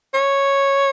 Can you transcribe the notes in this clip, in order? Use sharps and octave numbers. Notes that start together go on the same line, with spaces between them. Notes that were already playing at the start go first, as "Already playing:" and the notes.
C#5